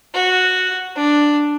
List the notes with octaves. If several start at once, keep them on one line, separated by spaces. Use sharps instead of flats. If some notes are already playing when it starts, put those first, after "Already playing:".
F#4
D4